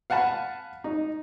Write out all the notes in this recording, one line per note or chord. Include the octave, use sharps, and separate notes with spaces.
F5 F#5 G#5 A5 B5
D#4